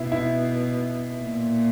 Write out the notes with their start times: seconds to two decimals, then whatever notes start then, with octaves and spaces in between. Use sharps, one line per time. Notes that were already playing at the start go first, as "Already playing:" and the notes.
Already playing: B2 E4
0.12 E4
1.21 A#2